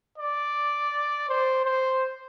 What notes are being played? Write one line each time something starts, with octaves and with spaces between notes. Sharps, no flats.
D5
C5
C5